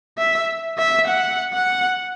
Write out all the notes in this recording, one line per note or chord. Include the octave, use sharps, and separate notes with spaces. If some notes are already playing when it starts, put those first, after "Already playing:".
E5
E5
F#5
F#5